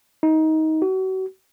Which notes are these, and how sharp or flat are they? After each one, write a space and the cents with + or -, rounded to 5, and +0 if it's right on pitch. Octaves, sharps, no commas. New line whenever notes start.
D#4 +20
F#4 +35